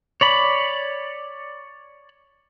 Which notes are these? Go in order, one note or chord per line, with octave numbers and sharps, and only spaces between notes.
C#5 D5 B5